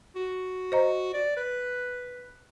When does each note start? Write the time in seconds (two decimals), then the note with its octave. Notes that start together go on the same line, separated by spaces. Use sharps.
0.16 F#4
0.72 C5 D#5 A#5
1.14 D5
1.37 B4